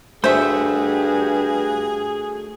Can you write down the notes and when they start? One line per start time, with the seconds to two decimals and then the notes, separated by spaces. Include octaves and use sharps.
0.24 G2 A3 D4 F#4 G#4 C5 E5